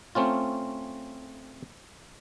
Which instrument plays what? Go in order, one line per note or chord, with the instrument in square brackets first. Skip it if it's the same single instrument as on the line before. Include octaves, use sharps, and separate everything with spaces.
[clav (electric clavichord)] A3 C4 C#4 F4